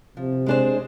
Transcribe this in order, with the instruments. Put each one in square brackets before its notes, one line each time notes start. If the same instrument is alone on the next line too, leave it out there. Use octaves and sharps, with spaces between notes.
[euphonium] C3 [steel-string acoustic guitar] F3
[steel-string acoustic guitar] G#3 D4 G#4 C5